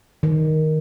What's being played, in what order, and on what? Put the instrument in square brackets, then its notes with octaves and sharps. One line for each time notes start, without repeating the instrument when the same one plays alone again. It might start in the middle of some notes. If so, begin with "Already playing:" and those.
[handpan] D#3